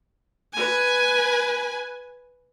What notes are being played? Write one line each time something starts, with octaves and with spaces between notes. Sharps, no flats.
B4 G#5